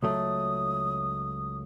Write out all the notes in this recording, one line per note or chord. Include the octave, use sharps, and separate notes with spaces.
C#2 F#3 A3 D#6